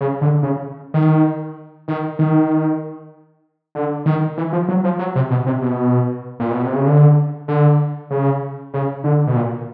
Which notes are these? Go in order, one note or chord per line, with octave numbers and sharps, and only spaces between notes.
C#3
D3
C#3
D#3
D#3
D#3
D3
D#3
E3
F3
F#3
F3
F#3
C3
B2
C3
B2
A#2
B2
C3
C#3
D3
D3
C#3
C#3
D3
B2
A#2